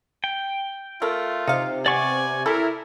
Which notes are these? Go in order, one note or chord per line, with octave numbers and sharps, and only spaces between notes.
G5
A3 F4 A#4
C3 D#4 F5
B3 D5 G#5 C#6 D6
E4 A4 A#4